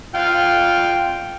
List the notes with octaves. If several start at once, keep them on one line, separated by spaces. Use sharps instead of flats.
F4 F5 G5